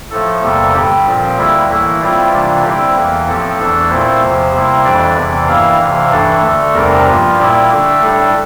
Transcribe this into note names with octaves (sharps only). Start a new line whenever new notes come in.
A2 F3 A3 A4
E2 C3 G3 A#3
G2 D3 G3 G4
A#2 F3 C4
D2 D3 G3 A#3 E4
A2 E3 A#3 E4
A2 G3 C4 E4 F4
C3 E3 G3 A#3 D4
D3 G3 C4 E4 G4
E2 E3 A#3
A2 F3 A3 C4 A4
E2 E3 A3 D4
A#2 A3 C4 E4 C5
E2 C3 F3
C3 G3 A#3 E4
F2 E3 G3 D4 D5
E2 C3 E3
G2 E3 A#3 E4 F5
D2 C3 E3
G2 E3 A3 D4 A4
D2 D3 A3
E2 C3 G3 D4 A#4
G2 F3 A#3 F4
A#2 G3 A#3 E4 G4
D3 A3 D4
A2 G3 D4 A4